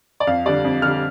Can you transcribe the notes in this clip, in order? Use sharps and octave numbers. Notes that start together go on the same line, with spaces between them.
D5
F2 F5
D3 G3 D5
F2
D3 G3 F6